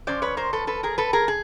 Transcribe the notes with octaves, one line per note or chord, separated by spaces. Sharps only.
F3 A3 C#4 C5 D5
B4 C#5
A#4 C5
A4 B4
A4 B4
G#4 A#4
A4 B4
G#4 A#4
G#4